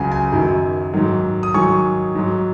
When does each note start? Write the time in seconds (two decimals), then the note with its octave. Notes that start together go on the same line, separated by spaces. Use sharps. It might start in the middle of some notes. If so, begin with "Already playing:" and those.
Already playing: C#2 C#3 F#3 F#5 G#5
0.12 G#5
0.32 F#2 D#3 F#3
0.94 G#2 D#3 F#3
1.43 D#6
1.54 G#2 D#3 F#3 G#5 C#6
2.15 G#2 F#3